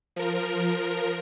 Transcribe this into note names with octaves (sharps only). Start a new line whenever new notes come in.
F3 A#4